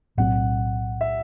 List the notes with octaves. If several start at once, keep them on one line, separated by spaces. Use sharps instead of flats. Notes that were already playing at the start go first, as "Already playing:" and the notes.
B1 A2 F#3 C4 F#5
E5